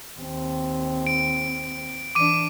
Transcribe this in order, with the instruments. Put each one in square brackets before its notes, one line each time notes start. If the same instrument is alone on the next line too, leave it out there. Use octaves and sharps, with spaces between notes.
[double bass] D#2 C4
[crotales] D7
[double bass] E3 D4 [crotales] D6 D#7